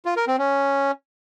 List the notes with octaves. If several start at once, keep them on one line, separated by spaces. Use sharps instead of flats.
F4
A#4
C4
C#4